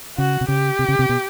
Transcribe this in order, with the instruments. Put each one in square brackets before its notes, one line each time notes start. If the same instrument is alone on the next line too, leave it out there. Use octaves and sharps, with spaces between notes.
[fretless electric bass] C#3 [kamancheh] F#4
[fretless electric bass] C3
[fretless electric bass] C#3 [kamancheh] G4
[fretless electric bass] C3
C#3
C3
B2